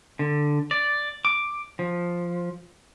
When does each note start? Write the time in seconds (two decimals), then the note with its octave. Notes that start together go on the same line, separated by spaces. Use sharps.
0.19 D3
0.71 D5
1.25 D6
1.79 F3